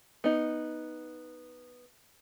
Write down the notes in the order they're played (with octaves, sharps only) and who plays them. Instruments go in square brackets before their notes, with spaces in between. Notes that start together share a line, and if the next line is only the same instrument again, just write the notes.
[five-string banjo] B3 D#4